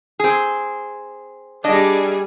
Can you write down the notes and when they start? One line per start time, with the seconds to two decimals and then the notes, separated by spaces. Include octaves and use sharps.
0.20 C4 G#4
1.64 G3 D4 G#4 D#5